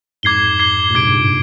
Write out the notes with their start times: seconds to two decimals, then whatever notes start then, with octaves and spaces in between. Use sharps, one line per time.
0.23 F2 G#2 D6 G#6 C7 G7
0.59 D6 G#6 C7 G7
0.90 A#2
0.95 G#2 C3 D6 G#6 D7
1.06 G2 A#2